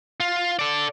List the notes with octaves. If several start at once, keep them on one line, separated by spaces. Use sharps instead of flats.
F4
A4 D5